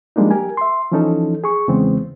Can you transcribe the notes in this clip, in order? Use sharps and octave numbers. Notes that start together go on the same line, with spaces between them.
F3 G3 G#3 A#3 D4 D#4
G4 A#4 G#5
E5 C6
E3 F3 C#4 D#4 A4
G#4 C#6
E2 C#3 E3 G#3 B3 C4